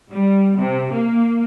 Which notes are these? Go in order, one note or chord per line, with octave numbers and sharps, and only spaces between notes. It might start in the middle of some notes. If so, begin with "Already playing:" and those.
G3
C3
A#3